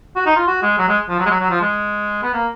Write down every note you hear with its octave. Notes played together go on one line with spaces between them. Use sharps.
F#4
D#4
F4
F#4
G#3
F#3
G#3
F3
F#3
G#3
F#3
F#3
F3
G#3
B3
A#3